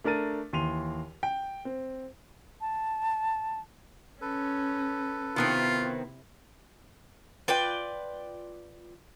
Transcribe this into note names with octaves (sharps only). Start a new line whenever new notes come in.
A3 D4 A#4 A6 D#7
D#2 E3 C6 D#7 F7
G5
C4
A5
C#4 A4 B4
C3 D#3 B3 C4 E4 F4
F4 B4 D5 G5